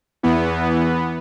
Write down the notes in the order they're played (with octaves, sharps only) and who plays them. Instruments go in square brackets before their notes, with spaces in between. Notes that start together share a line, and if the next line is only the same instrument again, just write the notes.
[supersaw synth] E2 E3 B3